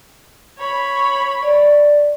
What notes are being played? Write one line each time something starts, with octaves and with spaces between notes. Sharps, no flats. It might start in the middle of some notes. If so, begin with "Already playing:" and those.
C#5 B5
D5